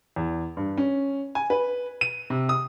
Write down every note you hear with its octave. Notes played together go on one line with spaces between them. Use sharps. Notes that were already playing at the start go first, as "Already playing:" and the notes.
E2
G2
C#4
G#5
B4
D#7
C3
D#6